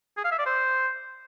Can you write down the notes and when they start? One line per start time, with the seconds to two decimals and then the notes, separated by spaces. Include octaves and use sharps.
0.17 G#4
0.24 F5
0.32 E5
0.39 D5
0.46 C5